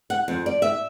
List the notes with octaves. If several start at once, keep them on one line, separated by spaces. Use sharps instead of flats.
F#5
F2
D5
E5